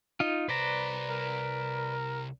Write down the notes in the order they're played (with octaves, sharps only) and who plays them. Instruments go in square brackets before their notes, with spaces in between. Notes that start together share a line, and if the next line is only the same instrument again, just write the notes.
[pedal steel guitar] D#4 F4
[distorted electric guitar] C2 C5 [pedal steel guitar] B4 D5 A#5
[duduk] A#4